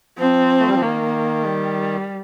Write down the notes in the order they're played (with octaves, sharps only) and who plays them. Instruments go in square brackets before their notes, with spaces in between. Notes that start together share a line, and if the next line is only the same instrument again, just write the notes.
[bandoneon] F3 [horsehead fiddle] C4
[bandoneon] A3
G3
F3
[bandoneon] D#3 [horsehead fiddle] A#3
[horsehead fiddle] G3